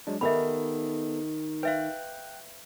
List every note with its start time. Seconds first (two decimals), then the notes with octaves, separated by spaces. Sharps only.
0.07 F#3 G#3 D4
0.21 D#3 B3 G4 A4 B4 E5 B5
1.63 B4 E5 F5 G5 F#6